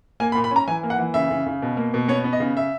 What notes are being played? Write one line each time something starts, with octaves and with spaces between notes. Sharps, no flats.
A#3 G#5
B5
A#2
B5
C#4 A#5
E3 G#5
A#3
F#5
E3
C#3 E5
C#3
C#3
B2
A#3
B2
B3 C#5
B3
D#5
C#3
E5